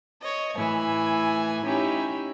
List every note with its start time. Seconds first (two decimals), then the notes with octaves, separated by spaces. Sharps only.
0.21 C#5 D#5
0.56 A2 E3 E4 G#5
1.65 C#4 D#4 E4 G4